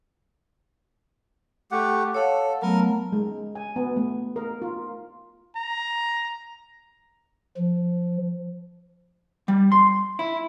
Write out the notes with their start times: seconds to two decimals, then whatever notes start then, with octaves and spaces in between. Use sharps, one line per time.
1.71 A3 G4 F#5
2.15 A4 C#5 F5 F#5
2.62 F#3 A3 B3 A#4
3.12 G#3
3.55 G#5
3.76 B3
3.96 A3
4.36 A#4
4.62 F4
5.56 A#5
7.57 F3
9.48 G3
9.72 C6
10.19 E4